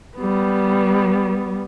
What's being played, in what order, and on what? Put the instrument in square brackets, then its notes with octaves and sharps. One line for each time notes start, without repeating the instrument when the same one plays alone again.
[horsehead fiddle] G3 B3